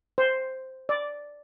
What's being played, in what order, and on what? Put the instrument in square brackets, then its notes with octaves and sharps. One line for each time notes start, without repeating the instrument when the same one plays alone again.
[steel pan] C5
D5